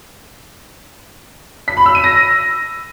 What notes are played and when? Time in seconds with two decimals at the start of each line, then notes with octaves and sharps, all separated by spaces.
1.68 B6
1.77 B5
1.86 E6
1.95 D#7
2.04 A#6